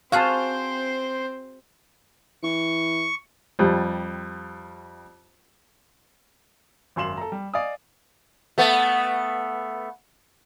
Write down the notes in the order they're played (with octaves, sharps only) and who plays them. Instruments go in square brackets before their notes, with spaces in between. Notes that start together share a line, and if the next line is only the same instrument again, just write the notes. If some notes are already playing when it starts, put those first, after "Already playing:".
[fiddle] C4 C5 [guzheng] F#4 G#4 F#5 [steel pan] F5 A5
[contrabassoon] E3 [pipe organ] C#6
[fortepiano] F2 G3
[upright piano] G#1 F#2 C6 E7 F#7
A4 A#5
G3
D5 D#5 F5 G#5 D#6
[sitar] A3 B3